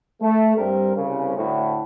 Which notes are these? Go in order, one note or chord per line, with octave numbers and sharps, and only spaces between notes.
A3
G2 G3 C4 A#4
C2 C#3
D2 A2